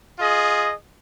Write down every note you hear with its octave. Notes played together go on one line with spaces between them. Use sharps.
F4 G#4 D#5